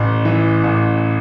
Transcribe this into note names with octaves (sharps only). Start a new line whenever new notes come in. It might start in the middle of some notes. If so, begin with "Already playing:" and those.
Already playing: A1
E3
A1